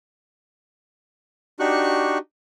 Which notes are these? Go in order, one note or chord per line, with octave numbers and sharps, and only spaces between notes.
D4 D#4 F#4 G4 C#6 F#6